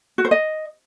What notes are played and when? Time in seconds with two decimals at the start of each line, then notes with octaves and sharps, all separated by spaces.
0.18 F#4
0.25 C5
0.31 D#5